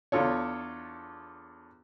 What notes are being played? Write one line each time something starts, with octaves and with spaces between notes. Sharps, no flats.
E2 D4 F4 A4 C#5